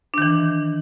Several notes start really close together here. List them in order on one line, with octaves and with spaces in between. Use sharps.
D4 D#3 E3